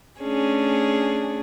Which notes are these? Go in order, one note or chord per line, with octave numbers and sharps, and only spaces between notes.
A3 C#4 D4 G#4